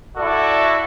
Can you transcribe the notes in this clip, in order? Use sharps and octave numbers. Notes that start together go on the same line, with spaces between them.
E4 F#4 A4 D5